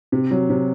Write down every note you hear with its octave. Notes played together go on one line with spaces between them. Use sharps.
C3
F#3
C3